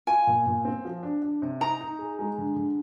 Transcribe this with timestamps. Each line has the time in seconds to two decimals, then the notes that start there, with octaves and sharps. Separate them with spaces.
0.07 F4 G#5
0.27 A#2
0.46 A#2
0.65 C4
0.85 F3
1.03 D4
1.22 D4
1.42 C3
1.60 D#4 A#5
1.81 D#4
1.99 G#4
2.19 G#3
2.38 D3
2.56 D3